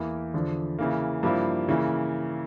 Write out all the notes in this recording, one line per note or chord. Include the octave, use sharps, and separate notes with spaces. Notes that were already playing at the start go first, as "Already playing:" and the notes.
Already playing: E2 E3 A#3
E2 D3 F3
C#3 E3 A#3
G2 F3 A#3 E4
C#3 E3 A#3